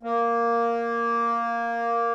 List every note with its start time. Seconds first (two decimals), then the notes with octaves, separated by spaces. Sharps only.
0.03 A#3